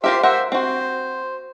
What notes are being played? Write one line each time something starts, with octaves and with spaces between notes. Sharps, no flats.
F4 G4 A#4 C5 E5 F5
A#4 C5 E5 F#5
C4 F#4 C5